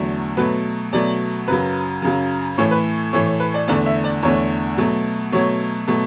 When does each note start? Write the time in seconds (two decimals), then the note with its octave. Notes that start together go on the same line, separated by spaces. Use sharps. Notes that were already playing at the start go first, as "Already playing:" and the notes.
Already playing: E2 D3 F#3 A3
0.37 B2 F#3 A3 B4
0.93 B2 F#3 A3 D5
1.48 F#2 C#3 F#3 B4
2.02 F#2 C#3 F#3
2.58 A2 E3 A3 C#5
2.71 B4
3.13 A2 E3 A3 C#5
3.26 C#5
3.40 B4
3.54 D5
3.68 E2 D3 A3 D5
3.86 E5
4.04 D5
4.23 E2 D3 A3 C#5
4.78 B2 F#3 A3
5.32 B2 F#3 A3 C#5
5.87 B2 F#3 A3